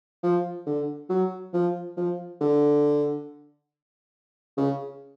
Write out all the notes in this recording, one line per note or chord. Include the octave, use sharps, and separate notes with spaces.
F3
D3
F#3
F3
F3
D3
C#3